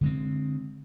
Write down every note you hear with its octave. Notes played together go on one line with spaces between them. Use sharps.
D3 G#3 C4